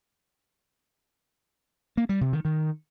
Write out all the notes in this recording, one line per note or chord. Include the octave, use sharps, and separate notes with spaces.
A#3
G3
C3
D#3
D#3